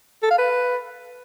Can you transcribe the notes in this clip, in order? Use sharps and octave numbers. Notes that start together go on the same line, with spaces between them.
A4
F5
B4